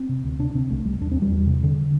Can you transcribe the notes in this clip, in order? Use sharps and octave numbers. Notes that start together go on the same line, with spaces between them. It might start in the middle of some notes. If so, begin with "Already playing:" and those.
Already playing: C4
C3
D2
C3 D4
C3 C4
C2 A3
C2 G3
E2 D4
E2 C4
G3
E2
C3
D3